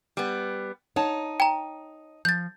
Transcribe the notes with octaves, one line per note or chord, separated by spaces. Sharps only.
G3 B3
D#4 C#5 F#5 A5
G5 A#5
F3 G6 A6